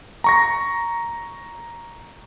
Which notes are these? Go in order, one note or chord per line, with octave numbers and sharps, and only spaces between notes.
A#5 C#6 A#6